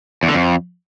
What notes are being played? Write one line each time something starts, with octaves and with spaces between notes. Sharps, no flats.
E2
D3
F2